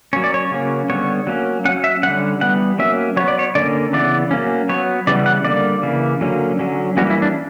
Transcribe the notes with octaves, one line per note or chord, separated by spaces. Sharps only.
F#3 A#3 C#4 C#5
D5
C#5
C#3 F#3 A#3 C#4
D3 G3 B3 C#5
F#3 A#3 C#4
F#3 C#4 F#5
E5
D3 G3 C#4 F#5
E3 G3 B3 F#5
F#3 A#3 C#4 E5
F#3 B3 C#5
D5
C#5
D3 A#3 C#4 D5
C#3 E3 B3 D5
F#3 A#3 C#4
F#3 B3 C#5
C#3 E3 G3 B3 D5
F#5
D3 G3 A#3 D5
C#3 E3 A#3
D3 F#3 A#3 C#4
D3 F#3 C#4
E3 G3 A#3 C#4 F#4
E4
D4